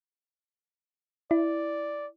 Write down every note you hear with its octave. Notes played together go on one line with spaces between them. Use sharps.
E4 D5